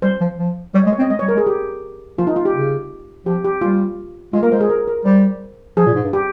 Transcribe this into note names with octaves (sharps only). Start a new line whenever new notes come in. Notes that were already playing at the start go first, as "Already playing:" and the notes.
G3 C5
F3
F3
G3 C#5
G#3 D#5
C#5
C4 D#5
G#3 D#5
G3 C#5
A#4
G#3
G#4
G4
F3 F4
D#4
F4
G4
C#3
F3 G4
G4
G3 F4
G#3 F4
A#3 A#4
G#3 C5
G#4
A#4
A#4
G3 C5
F3 G#4
A#2
G#2
G2
G4